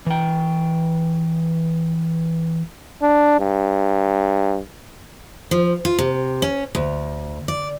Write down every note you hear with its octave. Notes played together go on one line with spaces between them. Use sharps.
E3 G5
D4
G2
F3
F4
C3
C#4
D2
D5